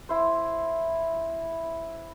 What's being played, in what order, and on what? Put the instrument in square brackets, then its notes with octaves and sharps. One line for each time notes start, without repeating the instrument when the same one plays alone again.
[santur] E4 C5